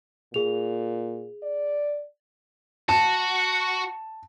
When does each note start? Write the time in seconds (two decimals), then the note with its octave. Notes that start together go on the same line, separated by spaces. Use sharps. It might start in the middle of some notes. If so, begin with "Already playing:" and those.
0.34 A#2 G#4 F7
1.43 D5
2.89 F#4 A5